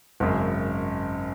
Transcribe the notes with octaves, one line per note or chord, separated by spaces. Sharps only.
G#1 F#2 C#3